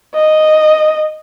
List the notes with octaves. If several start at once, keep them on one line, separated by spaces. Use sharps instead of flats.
D#5